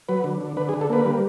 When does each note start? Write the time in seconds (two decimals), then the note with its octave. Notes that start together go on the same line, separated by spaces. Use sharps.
0.09 F#3 B4
0.24 D3
0.41 D3
0.57 D3 B4
0.69 G#4
0.74 D3
0.81 A4
0.90 A#3 B4
1.05 G3